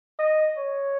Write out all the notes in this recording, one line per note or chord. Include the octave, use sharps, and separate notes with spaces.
D#5
C#5